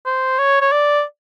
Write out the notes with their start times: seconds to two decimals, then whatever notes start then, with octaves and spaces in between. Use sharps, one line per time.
0.05 C5
0.38 C#5
0.61 C#5
0.72 D5